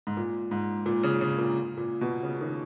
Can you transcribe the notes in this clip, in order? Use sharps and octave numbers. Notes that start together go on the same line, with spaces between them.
G#2
A#2
G#2
A#2
C#3
C#3
A#2
A#2
B2
C#3
D#3